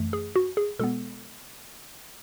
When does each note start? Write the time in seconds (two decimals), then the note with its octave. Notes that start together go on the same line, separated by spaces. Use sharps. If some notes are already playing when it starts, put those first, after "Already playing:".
Already playing: F#2 E3 A3
0.13 G#4
0.36 F#4
0.57 G#4
0.79 B2 G#3 B3 A4